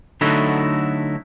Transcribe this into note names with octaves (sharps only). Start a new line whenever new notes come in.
D3 F#3 A3 D#4 E4 F#4